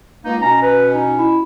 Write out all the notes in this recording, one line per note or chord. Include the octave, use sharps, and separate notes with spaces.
C#2 A#3 D#4
B2 C#4 A#5
B4
D#4
E4